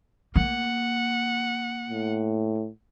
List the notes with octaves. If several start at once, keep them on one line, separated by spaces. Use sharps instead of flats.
A#3 F#5
A2